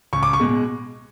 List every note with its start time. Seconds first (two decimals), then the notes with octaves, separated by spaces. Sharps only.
0.13 C#2 C#6
0.23 D6
0.33 C#6
0.40 B2 G#3